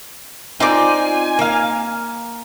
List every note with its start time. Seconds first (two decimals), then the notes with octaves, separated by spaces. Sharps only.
0.60 C4 D#4 F4 D5 G#5 D6
1.39 A#3 F5